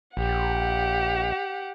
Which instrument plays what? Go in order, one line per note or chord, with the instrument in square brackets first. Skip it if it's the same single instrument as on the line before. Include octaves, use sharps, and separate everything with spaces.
[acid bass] A#1 [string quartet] G4 F#5